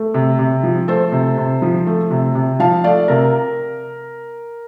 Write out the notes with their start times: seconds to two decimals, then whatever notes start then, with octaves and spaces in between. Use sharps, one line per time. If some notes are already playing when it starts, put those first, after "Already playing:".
Already playing: A3
0.14 C3
0.39 C3
0.63 F3
0.88 A3 A4 C5
1.12 C3
1.38 C3
1.62 F3
1.87 A3
2.11 C3
2.35 C3
2.60 F3 F5 A5
2.84 A3 D5 F5
3.08 C3 A#4